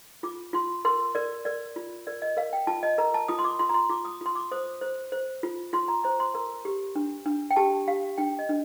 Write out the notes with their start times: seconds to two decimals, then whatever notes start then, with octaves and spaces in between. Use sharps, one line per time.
0.23 F4 D6
0.53 F4 C6
0.85 A#4 C6
1.15 A#4 D5
1.45 A#4 D5
1.76 F4
2.07 A#4 D5
2.22 D#5
2.37 A#4 F5
2.53 G5
2.67 F4 A5
2.83 D#5
2.98 A#4 A#5
3.14 A5
3.28 F4 D#6
3.39 C6
3.44 D6
3.59 F4 C6
3.69 A#5
3.74 C6
3.90 F4 D6
4.05 D#6
4.21 F4 C6
4.35 D6
4.52 C5 D#6
4.81 C5
5.12 C5
5.43 F4
5.73 F4 C6
5.88 A#5
6.04 C5 A#5
6.20 C6
6.34 A#4 A#5
6.65 G4
6.96 D4
7.26 D4
7.51 G5
7.56 G4 A5
7.88 G4 F5
8.18 D4 G5
8.39 D#5
8.49 D4